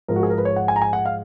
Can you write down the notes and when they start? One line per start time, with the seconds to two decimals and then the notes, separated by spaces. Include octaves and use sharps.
0.08 G#2 F3 G#3 A#4
0.16 F#4
0.23 G#4
0.30 A#4
0.38 B4
0.45 C#5
0.56 F#5
0.68 G#5
0.76 A#5
0.82 G#5
0.93 F#5
1.06 F5